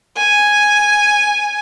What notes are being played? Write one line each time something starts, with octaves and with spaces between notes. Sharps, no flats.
G#5